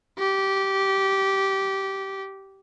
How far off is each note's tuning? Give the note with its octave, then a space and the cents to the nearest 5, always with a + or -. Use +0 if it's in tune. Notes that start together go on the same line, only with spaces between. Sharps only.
G4 -15